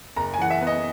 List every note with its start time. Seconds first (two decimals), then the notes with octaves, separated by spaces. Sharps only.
0.16 F#1 A#5
0.34 G#5
0.39 E3 F#5
0.50 E5
0.61 B3
0.67 D#5